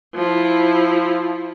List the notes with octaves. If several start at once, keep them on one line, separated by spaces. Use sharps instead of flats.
F3 E4